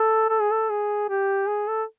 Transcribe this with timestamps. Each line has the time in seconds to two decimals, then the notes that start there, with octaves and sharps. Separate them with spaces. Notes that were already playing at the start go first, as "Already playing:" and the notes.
Already playing: A4
0.29 A4
0.41 G#4
0.51 A4
0.70 G#4
1.09 G4
1.48 G#4
1.68 A4